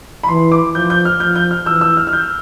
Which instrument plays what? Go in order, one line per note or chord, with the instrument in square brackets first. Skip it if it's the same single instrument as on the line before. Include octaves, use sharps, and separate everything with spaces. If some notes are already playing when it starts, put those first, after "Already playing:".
[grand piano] B5
[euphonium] E3 [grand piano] C6
[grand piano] D6
[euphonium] F3 [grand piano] G6
[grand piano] G6
F6
[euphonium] F3 [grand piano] G6
[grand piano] G6
F6
[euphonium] E3 [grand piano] E6
[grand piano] E6
F6
F6
G6